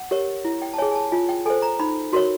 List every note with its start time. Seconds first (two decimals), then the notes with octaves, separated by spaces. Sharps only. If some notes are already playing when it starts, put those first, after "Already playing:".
Already playing: F#5
0.11 G4 A#4 C#5
0.45 E4
0.62 G5
0.74 A5
0.78 G#4 C#5 G#5
0.91 G#5
0.95 A5
1.12 F4 G#5
1.29 G5
1.46 A4 C5 G#5
1.62 A#5
1.80 D#4 B5
2.13 F#4 A#4 C#5 C6